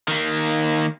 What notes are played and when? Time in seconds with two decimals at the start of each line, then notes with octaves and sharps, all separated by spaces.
0.08 D#3 A#3